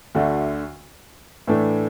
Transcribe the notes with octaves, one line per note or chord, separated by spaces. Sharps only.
D2 D3 A3 D4 F#4
A2 E3 A3 D4 A4